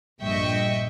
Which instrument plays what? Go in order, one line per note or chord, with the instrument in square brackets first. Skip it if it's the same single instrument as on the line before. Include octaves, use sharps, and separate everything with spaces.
[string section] A#1 G2 D#5 E5 G5 C#6